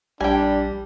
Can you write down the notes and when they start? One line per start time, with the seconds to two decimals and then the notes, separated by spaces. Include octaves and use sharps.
0.21 A#1 G3 D4 G5 G#5